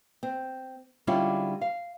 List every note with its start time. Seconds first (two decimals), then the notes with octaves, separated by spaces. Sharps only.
0.23 C4
1.07 D3 G3 G#3 C#4 E4 F4
1.61 F5